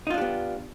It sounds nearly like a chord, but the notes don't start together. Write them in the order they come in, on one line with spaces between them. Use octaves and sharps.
D#4 F4 D4 G4 B3